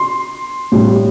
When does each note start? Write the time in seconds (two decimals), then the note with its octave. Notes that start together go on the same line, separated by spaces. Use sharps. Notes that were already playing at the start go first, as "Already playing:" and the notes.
Already playing: C6
0.72 A2 G3